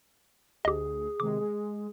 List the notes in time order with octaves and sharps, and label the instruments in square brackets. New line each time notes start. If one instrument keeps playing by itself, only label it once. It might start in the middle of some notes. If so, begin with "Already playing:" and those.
[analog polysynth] D2 [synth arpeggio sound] G4 D#5 [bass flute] G#4
[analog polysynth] C3 D#3 G#3 [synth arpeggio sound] D6
[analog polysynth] G#3